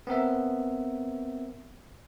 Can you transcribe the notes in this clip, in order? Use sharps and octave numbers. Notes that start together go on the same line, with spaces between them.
B3 C4 A#4 E5